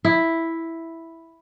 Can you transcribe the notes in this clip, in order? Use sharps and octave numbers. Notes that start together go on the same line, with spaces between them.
E4